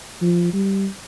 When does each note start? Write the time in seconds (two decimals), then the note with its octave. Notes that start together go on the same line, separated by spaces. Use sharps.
0.21 F3
0.53 G3